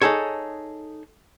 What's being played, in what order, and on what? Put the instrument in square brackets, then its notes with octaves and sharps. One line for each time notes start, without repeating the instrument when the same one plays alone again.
[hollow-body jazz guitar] D#4 G#4 A4 C#5